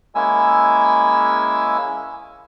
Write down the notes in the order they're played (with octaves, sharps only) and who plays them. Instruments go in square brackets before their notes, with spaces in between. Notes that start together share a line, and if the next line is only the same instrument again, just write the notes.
[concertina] G#3 A#3 C#4 E4 G#5 E6